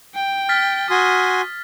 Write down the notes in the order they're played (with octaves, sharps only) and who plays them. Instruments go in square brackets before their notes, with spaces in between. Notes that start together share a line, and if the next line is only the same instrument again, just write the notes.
[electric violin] G5
[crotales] F6 A6 B6
[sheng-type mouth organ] F#4 G#5 C6 [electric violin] D#6